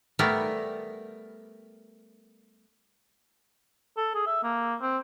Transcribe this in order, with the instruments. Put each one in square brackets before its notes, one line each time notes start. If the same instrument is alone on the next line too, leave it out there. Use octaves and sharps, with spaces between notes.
[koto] G3 A3 B3 A#4
[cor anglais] A4
G#4
E5
A#3
C4